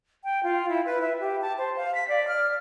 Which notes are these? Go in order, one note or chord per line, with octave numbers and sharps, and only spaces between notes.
G5
F4
E4
B4
E5
G4
A5
C5
F5
B6
D5
F6